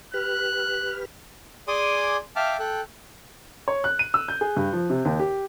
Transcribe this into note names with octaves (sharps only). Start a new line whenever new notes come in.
G4 B4 F6 F#6
G#4 D5 G#5 C6 D6 D#6
E5 F5 G5 A5 D6 F6
A4 G5 F#6
C#5
F#6
D#7
E6
G6
G#4
G2
F3
C3
D#2
G4